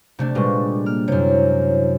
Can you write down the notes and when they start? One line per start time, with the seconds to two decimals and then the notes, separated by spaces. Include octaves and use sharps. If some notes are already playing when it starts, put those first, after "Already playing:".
0.19 C3 A3 D4
0.35 A#2 G3 G#3 B4 C#6
0.86 A#3 F6
1.08 F#2 C3 E4 C5 C#5